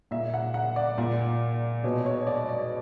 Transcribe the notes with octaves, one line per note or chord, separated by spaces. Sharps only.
A#2 E5
F#5
F#5
D5
A#2
B2 C#5
C#5
D5
D5